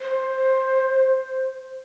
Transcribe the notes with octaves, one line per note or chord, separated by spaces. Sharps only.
C5